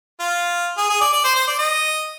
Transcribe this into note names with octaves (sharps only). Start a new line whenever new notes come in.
F4
G#4
G#4
D5
D5
C5
C5
D5
D#5